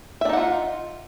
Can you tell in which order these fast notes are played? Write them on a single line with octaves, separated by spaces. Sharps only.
E5 D4 D#4 F#5 F4